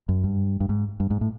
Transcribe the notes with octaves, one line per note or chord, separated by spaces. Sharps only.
F#2
G2
G2
G#2
G2
G#2
A2